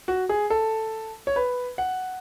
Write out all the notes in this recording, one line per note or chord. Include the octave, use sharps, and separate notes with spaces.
F#4
G#4
A4
C#5
B4
F#5